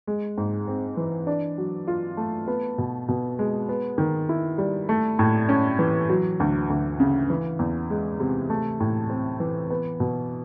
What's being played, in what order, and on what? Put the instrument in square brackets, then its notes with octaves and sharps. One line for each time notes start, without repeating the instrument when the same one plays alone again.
[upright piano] G#3
G#2
C4
E3
D4
F#3
F4
A3
B3
B2
B2
G#3
B3
D#3
E4
G3
A3
A2
C#4
E3
F#3
D2
D2
C#3
E3
E2
G#3
C3
A3
A2
C4
E3
B3
B2